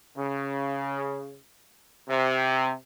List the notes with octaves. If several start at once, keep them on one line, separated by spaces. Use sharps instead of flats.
C#3
C3